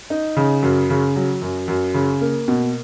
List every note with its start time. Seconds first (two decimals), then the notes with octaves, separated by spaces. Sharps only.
0.10 D#4
0.36 C#3
0.63 F#2
0.90 C#3
1.16 F#3
1.42 F#2
1.68 F#2
1.94 C#3
2.21 A#3
2.48 B2